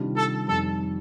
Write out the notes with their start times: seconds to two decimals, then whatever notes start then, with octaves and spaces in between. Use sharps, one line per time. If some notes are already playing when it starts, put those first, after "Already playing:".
Already playing: C3 D#3 G3 D4 F4
0.15 A4
0.47 F2 D#3 G3 A4